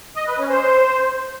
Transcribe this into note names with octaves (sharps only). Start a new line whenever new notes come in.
D#5
B4
C#4
C5